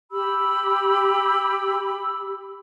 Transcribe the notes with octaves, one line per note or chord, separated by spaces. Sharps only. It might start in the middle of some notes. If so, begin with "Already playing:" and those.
G4 B5 E6